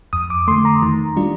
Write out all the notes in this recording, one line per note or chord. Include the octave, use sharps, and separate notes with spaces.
F2 D#6
D6
D3 A3 C6
A#5
D#3
G3 D4 F4